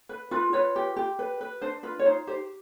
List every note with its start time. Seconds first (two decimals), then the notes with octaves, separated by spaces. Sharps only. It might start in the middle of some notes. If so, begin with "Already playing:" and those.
0.09 B4
0.31 F4 B4
0.53 F4 B4 C#5
0.76 G4
0.96 G4
1.19 B4
1.41 B4
1.61 D4 C5
1.83 F4 B4
1.99 C#5
2.05 D#4 C5
2.27 G4 C5